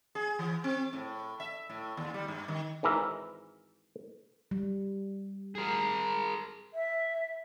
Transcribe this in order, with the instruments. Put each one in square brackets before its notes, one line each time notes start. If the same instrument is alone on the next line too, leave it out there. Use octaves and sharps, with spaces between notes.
[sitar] G#4
E3
C4
A2
E5
A2
D#2
G3
G2
D#3
[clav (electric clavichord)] G#1 E3 A#4 E5
[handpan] G3
[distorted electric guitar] G#4 A#4
[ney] E5